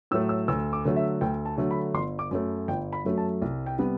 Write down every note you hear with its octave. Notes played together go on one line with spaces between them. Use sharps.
A2 F#3 A3 E6
E6
D2 E6
D6
D3 F#3 A3
E5
D2 G5
A5
D3 F#3 A3
B5
G1 C6
D6
F#2 F#3 A3
G1 G5
B5
F#2 F#3 A3
A5
C2
G5
C3 G3 B3